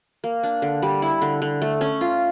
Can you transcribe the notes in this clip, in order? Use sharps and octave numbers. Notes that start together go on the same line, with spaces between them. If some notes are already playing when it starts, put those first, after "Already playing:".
A#3
D4
D3
G3
E4
D3
D3
A3
C#4
F4